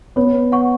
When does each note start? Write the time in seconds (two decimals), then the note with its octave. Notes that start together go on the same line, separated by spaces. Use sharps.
0.16 B3 C#5
0.52 F#5 C#6